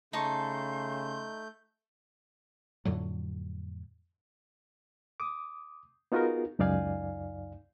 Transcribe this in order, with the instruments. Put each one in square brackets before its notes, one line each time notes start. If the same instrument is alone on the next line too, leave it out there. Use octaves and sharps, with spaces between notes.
[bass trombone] C#3 [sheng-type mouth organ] A3 G6 [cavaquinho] D#4 A5 C#6 [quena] C6
[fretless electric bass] F2 A2 D3 F#3
[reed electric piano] D6 D#6
B3 D#4 F4 F#4 G#4 A#4
C#2 F#2 D#4 D5 F5 G#5